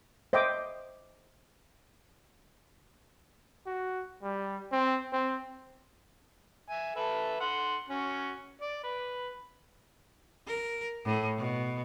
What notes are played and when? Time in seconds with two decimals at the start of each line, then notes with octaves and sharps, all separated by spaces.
0.33 C5 D#5 E5 G5 B5 D6
3.66 F#4
4.22 G3
4.72 C4
5.13 C4
6.69 E5 G#5
6.96 A4 B4 E5
7.40 F#5 C6
7.89 C#4 F#4
8.61 D5
8.83 B4
10.47 A#4
11.05 A2
11.37 B2